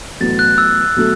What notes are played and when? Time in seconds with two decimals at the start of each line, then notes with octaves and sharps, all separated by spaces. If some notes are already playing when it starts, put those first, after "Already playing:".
0.20 A1 A2 F#3 B3 A6
0.39 F#6
0.58 E6
0.96 B2 F#3 A3